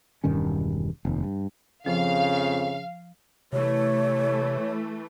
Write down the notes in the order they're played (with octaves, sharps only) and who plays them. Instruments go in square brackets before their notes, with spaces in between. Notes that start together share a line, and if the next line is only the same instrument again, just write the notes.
[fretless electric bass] E1 G2 D#3 C#4
F1 D#2
G2
[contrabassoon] F2 [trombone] C#3 [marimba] F3 [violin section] F5
[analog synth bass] C3 [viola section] E3 A3 [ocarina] C#5